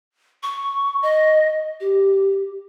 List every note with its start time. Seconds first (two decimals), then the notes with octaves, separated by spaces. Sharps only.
0.43 C#6
1.03 D#5
1.80 G4